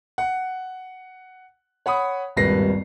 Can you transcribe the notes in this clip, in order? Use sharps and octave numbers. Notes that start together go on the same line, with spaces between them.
F#5
C#5 F#5 B5 D#6
D#1 G#1 G2 B4 A#6 C7